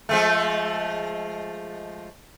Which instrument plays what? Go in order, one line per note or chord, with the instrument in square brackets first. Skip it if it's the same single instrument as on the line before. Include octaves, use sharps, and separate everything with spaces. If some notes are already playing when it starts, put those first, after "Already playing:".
[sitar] F3 G#3 A3